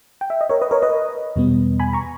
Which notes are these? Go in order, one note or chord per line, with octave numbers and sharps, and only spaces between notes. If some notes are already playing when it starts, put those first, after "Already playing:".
G5
E5
D#5
A#4 C#5
B4 D#5
A#4 C#5
B4 D#5
E2 B2 G3 B3
G#5 B5
A#5 C#6